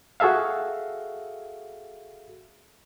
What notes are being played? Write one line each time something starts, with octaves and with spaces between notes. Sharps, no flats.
F#4 G#4 A4 E5 F5